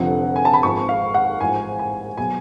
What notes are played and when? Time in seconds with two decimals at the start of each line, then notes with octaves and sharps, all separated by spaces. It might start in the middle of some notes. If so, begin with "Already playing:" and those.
Already playing: F1 F2 D3 F3 F#5
0.36 G#5
0.45 A5
0.53 B5
0.63 G#1 G#2 F3 C#6
0.89 F5
1.14 F#5
1.40 A1 G#2 F3 G#5
1.79 G#5
2.17 B2 F#3 G#5